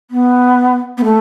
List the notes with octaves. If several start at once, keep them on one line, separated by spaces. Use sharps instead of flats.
B3
B3
A3